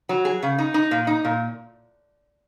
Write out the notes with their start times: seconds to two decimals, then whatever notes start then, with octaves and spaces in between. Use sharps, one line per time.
0.09 F#3
0.25 G#4
0.43 C#3
0.58 D#4
0.74 D#4
0.91 A#2
1.07 D#4
1.25 A#2